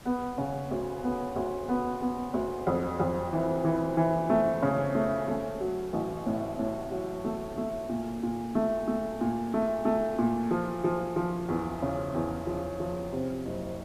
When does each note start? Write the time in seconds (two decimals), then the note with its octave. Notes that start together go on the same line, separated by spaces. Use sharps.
0.05 B3
0.38 C#3
0.71 D2
1.03 B3
1.36 D2
1.68 B3
2.01 B3
2.34 D2
2.67 F2
3.00 F2
3.33 E3
3.65 E3
3.97 E3
4.30 A3
4.62 C#3
4.95 A3
5.28 A3
5.60 F#3
5.93 A1
6.26 A2
6.59 A2
6.91 F#3
7.25 A3
7.58 A3
7.89 A#2
8.23 A#2
8.55 A3
8.88 A3
9.21 A#2
9.54 A3
9.85 A3
10.18 A#2
10.51 F3
10.84 F3
11.16 F3
11.49 E2
11.82 C#3
12.14 E2
12.47 F3
12.80 F3
13.13 C3
13.45 F#1